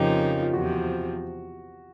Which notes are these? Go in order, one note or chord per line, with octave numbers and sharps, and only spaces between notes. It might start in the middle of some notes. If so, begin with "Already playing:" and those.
Already playing: F2 C#3 F3 A#3 D#4 G4
F4
E2 C3 F3 F#4